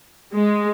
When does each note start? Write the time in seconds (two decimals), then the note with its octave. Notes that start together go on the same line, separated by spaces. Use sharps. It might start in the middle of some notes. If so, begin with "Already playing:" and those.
0.35 G#3